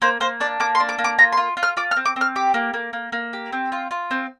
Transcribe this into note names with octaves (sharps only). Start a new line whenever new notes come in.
A#3 C5
A#3 C5
D4 D5
A#3 D6
C6
D4
D6
A#3
D6
F4 A#5
C6
F4
F4
F6
F4 D6
F6
C4
D6
C4 F6
G4 D6
A#3
A#3
A#3
A#3
G4
C4
F4
F4
C4